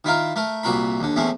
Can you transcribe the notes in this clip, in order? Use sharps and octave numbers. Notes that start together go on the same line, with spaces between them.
D#3 E4 F4 A#4
A3 A#4
C2 A#2 F#4 A#4 B5
D#2 D3
E2 A2 A3 C4 C#4